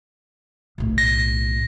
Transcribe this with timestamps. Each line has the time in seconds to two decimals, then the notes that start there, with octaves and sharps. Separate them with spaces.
0.78 B1 A2
0.98 A#6